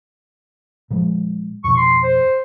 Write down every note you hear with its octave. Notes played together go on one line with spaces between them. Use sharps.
A#2 F3 G#3
F2 B2 C#6
C6
C5